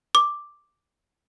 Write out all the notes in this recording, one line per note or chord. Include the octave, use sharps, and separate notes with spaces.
D6